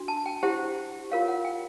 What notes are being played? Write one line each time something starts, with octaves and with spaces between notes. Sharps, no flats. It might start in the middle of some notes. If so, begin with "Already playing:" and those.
Already playing: D4 F#4
A5
G5
E4 G4 C5 F#5
F4 A#4 C#5 F5
F#5
G5